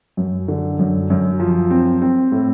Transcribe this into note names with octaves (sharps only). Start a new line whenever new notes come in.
F#2
D3
F#2
F#2
F3
C4
C4
A2